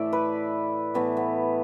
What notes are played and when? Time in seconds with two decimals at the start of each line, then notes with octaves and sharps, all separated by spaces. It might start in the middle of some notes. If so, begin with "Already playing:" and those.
Already playing: A2 E3 A3 D5 E5
0.13 B4
0.94 A2 E3 A3 B3
1.17 B3